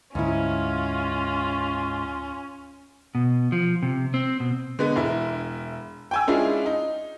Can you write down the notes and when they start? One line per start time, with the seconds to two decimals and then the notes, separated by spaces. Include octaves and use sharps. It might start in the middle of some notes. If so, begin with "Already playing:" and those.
0.15 D2 G#2 C#4 E4 F4
3.15 B2
3.52 F3
3.83 C3
4.14 C4
4.40 B2
4.79 D3 G#3 B3
4.96 E1 E4
6.11 G5 G#5 E6
6.28 G#3 C#4 D4 E4 F4 G#4
6.66 D#4